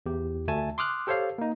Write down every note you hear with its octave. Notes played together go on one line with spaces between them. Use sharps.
E2 G4
D2 A3 G#5 A5
C6 D6 D#6 F6 F#6
G4 A4 C5 C#5 F5
A#3 D#4